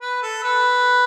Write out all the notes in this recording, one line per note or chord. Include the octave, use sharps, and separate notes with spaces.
B4
A4
B4